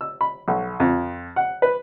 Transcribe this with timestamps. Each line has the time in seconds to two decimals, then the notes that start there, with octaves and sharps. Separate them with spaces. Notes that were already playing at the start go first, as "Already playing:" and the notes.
0.01 E6
0.21 B5
0.48 B1
0.80 F2
1.36 F#5
1.62 B4